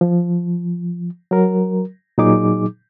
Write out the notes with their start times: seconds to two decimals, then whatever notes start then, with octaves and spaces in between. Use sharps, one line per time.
0.01 F3
1.31 F#3 A#4
2.18 A#2 F#3 D#4 G#4 D6